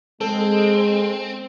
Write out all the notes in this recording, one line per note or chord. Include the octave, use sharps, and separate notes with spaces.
G#3 C4 A4